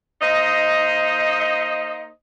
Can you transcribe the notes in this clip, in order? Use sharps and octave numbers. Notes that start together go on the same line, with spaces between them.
A#3 D#4 C5 D#5